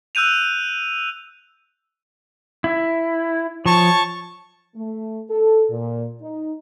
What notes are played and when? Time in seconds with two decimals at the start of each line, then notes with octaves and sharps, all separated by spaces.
0.15 E6 F#6 G6 D#7 F7
2.64 E4
3.66 F3 C#5 A5 C#6
4.76 A3
5.30 A4
5.70 A#2
6.22 D#4